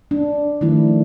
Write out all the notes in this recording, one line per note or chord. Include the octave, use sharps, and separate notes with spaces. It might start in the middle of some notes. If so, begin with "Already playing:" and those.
D4
D#3 F3 A3 E4